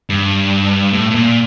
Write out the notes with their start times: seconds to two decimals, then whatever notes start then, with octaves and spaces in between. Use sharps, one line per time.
0.10 G2
0.93 A2
1.11 A2
1.15 A#2